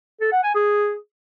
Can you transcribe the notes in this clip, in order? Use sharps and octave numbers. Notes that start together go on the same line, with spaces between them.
A4
F#5
G#5
G#4